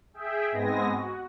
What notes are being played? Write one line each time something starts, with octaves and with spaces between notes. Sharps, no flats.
G#4 E5 G5
G#2 G#3 B3 C4 G#5 A#6
F#4